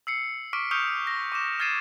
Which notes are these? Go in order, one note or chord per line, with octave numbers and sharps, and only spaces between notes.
E6 C7 C#7
C#6 D6 F6 B6 D7
C#6 D#6 F6 G6 C#7 F7
A#6
C#6 D6 E7
F6 G#6 A6 C7 D#7 E7